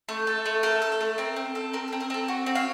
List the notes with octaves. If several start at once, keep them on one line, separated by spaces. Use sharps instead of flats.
A3
A4
A3
A4 A#4
A4
A4
A3
C4 A#4
C4
A4
C4 A#4
A4
C4
A#4
C4 A4
F#4
C4
C#5 F5